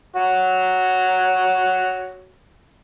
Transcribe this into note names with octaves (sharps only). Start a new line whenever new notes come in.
F#4 C#5